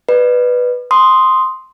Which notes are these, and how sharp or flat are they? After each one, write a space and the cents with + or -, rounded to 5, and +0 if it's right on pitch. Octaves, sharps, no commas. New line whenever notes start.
B4 +0 D5 +40
C6 +0 D#6 +0